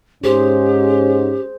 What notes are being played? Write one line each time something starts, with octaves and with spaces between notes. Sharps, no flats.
G#2 C#4 G4 G#4 C5